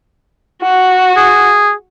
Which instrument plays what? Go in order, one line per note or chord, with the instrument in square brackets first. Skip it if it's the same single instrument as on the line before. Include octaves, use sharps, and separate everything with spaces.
[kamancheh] F#4
[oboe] G#4